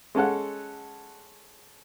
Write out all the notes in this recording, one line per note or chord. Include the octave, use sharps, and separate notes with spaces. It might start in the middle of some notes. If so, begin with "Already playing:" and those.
G#3 C#4 A4 F#5